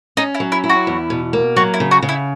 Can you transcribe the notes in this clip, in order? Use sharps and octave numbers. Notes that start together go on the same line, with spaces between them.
C#4 D#4
E4
F#3
E4
E4
F#4
E2
B2
A#3
F#3 F#4
E4
C#3
F#4
C#3
E4